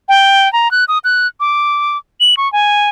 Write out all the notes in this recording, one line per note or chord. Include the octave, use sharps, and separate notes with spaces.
G5
A#5
F#6
D#6
F#6
D6
F#7
C#6
G#5